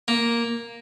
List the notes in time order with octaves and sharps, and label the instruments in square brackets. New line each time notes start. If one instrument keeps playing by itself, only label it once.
[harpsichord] A#3